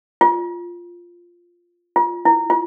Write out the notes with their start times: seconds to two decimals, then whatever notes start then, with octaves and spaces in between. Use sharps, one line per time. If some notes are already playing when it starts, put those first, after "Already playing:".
0.21 F4
1.96 F4
2.25 E4
2.50 F4